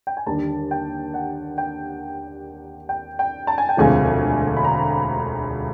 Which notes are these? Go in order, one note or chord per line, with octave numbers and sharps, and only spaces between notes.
G5
G#5
D#2 D3 G3 A5
G5
F#5
G5
G5
G5
A5
G#5
G5
E1 D2 C3 F3 G#3 G#5
B5
A#5